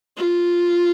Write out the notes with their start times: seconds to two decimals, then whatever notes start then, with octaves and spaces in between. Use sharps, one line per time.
0.18 F4